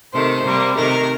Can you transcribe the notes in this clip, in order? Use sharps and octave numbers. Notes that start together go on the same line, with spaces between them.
C3 D#3 A3 C5
C3 G3 A#3
C3 D#3 A3 A#4